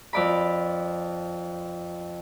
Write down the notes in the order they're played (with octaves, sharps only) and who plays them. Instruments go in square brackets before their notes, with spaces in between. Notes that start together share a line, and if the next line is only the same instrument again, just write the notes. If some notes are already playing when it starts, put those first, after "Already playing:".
[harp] F2 D5 B5